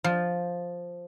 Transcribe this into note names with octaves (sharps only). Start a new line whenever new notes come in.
F3